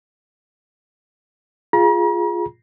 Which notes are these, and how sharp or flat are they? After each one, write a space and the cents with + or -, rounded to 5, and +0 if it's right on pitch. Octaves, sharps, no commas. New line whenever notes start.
F4 +0 G#4 +0 A#5 +40